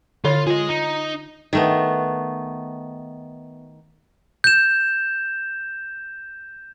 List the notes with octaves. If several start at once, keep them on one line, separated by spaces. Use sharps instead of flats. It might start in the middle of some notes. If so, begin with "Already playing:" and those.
D3 F4 C#5 F5
F4 G#4 D#5
D#4
D#3 A3 B3
G6 E7